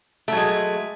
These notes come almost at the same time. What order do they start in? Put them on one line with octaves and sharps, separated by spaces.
A3 F#3 G#3